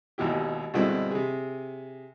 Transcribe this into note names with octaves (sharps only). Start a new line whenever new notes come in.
G#1 D#2 B2 E4 G4
G2 B2 D3 G#3 C4 E4
C3 G#4